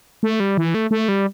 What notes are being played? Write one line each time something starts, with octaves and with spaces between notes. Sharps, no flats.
A3
G3
E3
A3
A3
G3